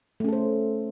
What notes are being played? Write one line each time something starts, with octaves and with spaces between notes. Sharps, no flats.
A3 C#4 A4 C5